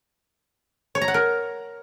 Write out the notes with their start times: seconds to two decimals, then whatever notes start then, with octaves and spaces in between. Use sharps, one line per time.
0.95 C#5
1.01 A#5
1.08 F#5
1.14 A#4